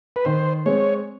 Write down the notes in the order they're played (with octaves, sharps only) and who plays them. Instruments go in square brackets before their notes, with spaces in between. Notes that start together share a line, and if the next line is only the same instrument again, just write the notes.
[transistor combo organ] B4
[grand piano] D#3 [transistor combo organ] C5
[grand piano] G#3 C4 [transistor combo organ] C#5